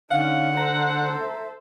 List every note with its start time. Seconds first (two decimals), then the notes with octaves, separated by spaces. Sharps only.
0.11 D3 C#4 D#4 F5 F#5
0.57 A4 C5 A#5
1.20 E5